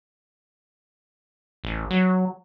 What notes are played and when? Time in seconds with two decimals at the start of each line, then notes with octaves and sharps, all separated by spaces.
1.64 A1
1.91 F#3